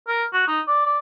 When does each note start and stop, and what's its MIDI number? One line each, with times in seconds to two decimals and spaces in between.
0.08 0.23 70
0.33 0.44 66
0.47 0.60 63
0.67 0.84 74
0.86 0.98 74